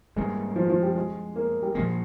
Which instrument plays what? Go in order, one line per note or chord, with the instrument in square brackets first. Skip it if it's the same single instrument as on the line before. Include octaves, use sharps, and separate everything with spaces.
[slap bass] G#2 G3 A#3 [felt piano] G#3
[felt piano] F3
F3
G3
G#3
A#3
G3
[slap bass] A#2 F3 A#3 [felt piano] G#3